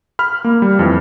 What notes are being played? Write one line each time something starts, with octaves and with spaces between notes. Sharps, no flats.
B5 F6
A#3
G3
F2 E3